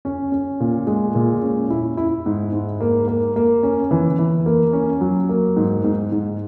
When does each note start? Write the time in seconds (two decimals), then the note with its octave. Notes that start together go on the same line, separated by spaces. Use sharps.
0.05 C#4
0.32 C#4
0.60 A#2
0.87 G#3
1.15 A#2
1.43 C#4
1.70 E4
1.97 E4
2.26 G#2
2.53 G#2
2.80 A#3
3.08 A#3
3.36 A#3
3.63 C#4
3.91 E3
4.19 E3
4.46 A#3
4.73 C#4
5.01 F#3
5.29 A#3
5.56 G#2
5.84 G#2
6.12 G#2